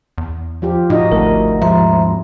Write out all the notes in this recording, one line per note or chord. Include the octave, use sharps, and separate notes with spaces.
E2
F3 F4 G4
A2 D#4 F#4 D#5
G#1 D2 A3 A#4
D#2 G#2 F3 G#3 E5 A#5 C6